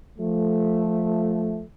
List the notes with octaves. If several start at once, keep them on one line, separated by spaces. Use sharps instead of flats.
F3 A3